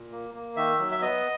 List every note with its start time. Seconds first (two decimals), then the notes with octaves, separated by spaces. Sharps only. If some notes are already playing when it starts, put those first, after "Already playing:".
Already playing: A#2
0.12 A#3
0.34 A#3
0.56 D#3 E5
0.79 F#3
0.92 E5
1.01 B3 D#5